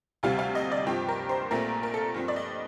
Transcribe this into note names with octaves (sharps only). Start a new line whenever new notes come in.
D2 C3 G3 F5
F5
D#5
D5
G2 F3 C4 G4
A#4
C5
A#1 A#2 A3 C4 A#4
A#4
A4
G2 F3 C4
D5
D#5